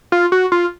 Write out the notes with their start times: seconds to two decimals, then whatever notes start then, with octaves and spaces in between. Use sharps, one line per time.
0.12 F4
0.32 F#4
0.52 F4